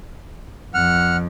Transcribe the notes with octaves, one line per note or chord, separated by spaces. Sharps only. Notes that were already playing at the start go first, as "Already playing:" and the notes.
F2 F#5 F6